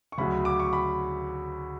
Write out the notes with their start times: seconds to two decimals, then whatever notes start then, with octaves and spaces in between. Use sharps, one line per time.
0.12 C#6
0.18 D2 C#3 F#3 B5
0.45 D6
0.60 C#6
0.73 B5